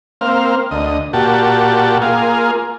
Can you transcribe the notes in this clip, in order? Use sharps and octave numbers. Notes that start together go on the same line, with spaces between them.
A#3 C4 F5
D2 D#5
A#2 F#4 G4 A5
A#3 F4 G#4